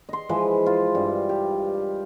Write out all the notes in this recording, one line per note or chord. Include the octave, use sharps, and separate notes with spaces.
D#5 C6
E3 F3 G#3 B4
F4
G2
G4